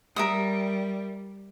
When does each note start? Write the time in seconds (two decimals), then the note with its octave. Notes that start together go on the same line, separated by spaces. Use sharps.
0.16 G3 A#4 E5 D#6